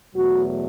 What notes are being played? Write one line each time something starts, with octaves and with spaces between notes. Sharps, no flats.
E2 B2 F#3 A3 F#4